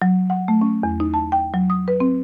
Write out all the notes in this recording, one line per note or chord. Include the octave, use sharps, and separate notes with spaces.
F#3
F#5
A3
C#4
E2
D#4
A5
G5
F#3
D#6
B4
C4